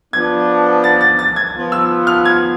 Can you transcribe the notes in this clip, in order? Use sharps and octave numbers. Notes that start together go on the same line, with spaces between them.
F3 B3 D4 G#6
A6
A6
A6
G#6
F3 B3 F4
E6
F6
G#6